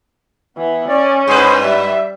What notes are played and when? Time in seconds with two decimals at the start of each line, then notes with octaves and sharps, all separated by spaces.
0.57 E3 B3
0.88 C#4 D5
1.28 G2 G#4 B4 C5
1.63 G3 E5